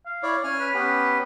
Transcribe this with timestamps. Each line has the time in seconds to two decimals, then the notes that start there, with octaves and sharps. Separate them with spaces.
0.06 F5
0.23 E4 C#5 D5
0.44 C#4 G#5 F6
0.60 B4
0.74 B3 C#4 G4